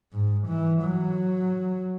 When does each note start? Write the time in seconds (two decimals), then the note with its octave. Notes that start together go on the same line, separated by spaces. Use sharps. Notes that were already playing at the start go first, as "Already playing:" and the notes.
0.12 G#2
0.48 E3
0.83 F#3